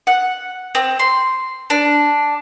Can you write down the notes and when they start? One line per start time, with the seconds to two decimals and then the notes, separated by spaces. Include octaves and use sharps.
0.07 F#5
0.75 C4
0.99 C6
1.70 D4